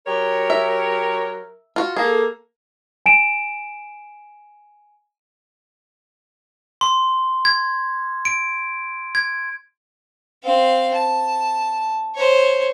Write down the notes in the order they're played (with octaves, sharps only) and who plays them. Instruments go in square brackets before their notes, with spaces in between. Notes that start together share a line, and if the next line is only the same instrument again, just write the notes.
[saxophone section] F#3 G4 C#5 [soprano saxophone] A#4
[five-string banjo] E5
F4 F#4
[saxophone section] A#3 A4 [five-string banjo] G#4
[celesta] G#5 D7 E7
[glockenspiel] C6
G#6
D7
G#6
[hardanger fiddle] C4 F5
A5
C5 C#5